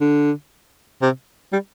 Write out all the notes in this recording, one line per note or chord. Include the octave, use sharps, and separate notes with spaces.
D3
C3
G3